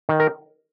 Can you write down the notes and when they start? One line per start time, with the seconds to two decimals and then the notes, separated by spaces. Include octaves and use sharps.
0.09 D#3
0.20 A#4